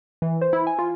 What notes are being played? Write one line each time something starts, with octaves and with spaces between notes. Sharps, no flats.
E3
C5
E4
G#5
F4